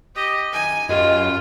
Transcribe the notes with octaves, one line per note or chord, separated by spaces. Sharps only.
G4 D#5
F#2 D#3 G#5
F#2 F4 G4 D#5